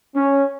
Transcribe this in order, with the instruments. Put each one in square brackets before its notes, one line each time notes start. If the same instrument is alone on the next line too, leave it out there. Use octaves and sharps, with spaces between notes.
[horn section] C#4